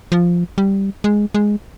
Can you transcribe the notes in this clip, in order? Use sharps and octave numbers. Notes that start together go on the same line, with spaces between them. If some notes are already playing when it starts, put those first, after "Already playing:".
F3
G3
G#3
G#3